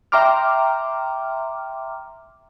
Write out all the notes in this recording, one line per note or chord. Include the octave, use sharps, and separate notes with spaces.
E5 G5 A#5 C6 D6 F6